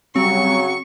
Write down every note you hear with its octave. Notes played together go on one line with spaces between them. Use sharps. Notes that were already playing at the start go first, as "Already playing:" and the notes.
C#3 F#3 G3 C4 C#6